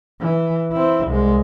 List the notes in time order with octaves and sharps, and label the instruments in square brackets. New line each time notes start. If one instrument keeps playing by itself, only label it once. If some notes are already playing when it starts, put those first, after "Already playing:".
[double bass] E3
C4 E4
C2 G#3